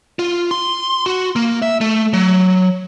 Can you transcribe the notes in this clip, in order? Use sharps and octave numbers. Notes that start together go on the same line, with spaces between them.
F4
C6
F#4
A#3
E5
A3
F#3